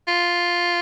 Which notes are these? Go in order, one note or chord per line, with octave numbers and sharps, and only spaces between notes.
F4